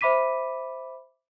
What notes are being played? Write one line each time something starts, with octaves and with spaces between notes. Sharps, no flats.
C5 E5 B5 D6 B6 D#7